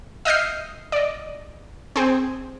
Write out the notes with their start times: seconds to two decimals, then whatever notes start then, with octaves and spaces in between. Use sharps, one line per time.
0.25 D#5 E5 D#6 F6 G6 C7
0.92 D5 D#5
1.96 C4 G#4